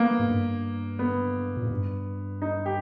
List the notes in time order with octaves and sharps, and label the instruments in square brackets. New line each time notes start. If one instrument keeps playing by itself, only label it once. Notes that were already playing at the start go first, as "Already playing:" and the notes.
Already playing: [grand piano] A#3 B3
[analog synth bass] G#2
G2
[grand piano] B3
[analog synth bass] A#2
G#2
G2
[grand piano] D#4
G4